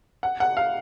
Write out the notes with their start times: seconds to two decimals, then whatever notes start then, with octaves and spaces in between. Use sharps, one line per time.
0.23 F#5
0.40 F#5
0.57 F5